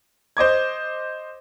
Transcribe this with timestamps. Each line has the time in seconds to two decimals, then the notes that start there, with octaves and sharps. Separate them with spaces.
0.37 C5 D#5 D6 G#6